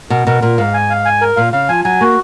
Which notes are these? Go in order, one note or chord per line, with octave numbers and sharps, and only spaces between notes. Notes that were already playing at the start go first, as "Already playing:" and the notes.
B2 A#4
B2 A#4
A#2 A#4
G#2 F5
G#5
F5
G#5
A#4
A#2 F5
C#3 F5
F3 G#5
F#3 G#5
A#3 F#4